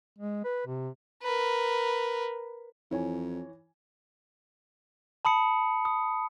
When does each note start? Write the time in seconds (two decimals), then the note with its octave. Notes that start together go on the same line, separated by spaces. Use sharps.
0.19 G#3
0.45 B4
0.67 C3
1.23 A#4 B4
2.91 F2 E3 C#5 G#5
5.25 A5 B5 D#6 C#7
5.85 D#6